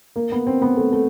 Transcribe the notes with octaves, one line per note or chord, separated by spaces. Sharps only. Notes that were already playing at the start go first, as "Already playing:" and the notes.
A#3
B3
C4
B3
A3
A3